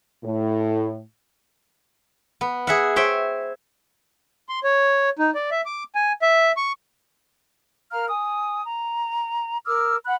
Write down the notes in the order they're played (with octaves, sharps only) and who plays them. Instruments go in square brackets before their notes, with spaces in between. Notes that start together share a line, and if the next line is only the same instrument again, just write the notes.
[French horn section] A2
[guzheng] B3
G#4 E5 F#5
C5 C#5 E5 G5
[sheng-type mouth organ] C6
C#5
D#4
D5
E5
D6
G#5
E5
C#6
[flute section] A#4 F5 A#5 F6
G#5 D#6
A#5
A#4 D6 E6 F6
F#5 B5 F#6